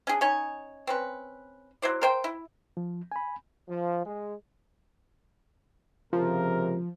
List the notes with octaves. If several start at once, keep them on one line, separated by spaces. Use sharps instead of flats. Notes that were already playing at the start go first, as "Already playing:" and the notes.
C#4 D4 G#4
C#4 D#4 C#5 G#5
C4 C#4 B4
F#3 E4 C5 D5
A#4 C5 G5
E4
F3
G#5 B5
F3
G#3
C#2 C3 F3 A#4